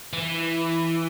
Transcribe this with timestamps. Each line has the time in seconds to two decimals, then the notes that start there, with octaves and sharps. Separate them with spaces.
0.13 E3